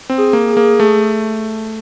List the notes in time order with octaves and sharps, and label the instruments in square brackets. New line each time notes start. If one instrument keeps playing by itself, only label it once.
[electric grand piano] C4
[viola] G#4
[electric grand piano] A#3
[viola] G#4
[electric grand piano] A#3
A3